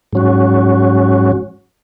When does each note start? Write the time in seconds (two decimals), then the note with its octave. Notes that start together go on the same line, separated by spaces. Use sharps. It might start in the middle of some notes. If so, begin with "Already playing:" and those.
0.13 G#2 F#3 C#4 F#4